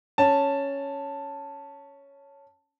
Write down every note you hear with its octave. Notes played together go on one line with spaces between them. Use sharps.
C#4 A5